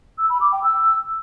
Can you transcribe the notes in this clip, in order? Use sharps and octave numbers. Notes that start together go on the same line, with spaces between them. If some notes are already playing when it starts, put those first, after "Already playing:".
E6
B5
D6
G5
E6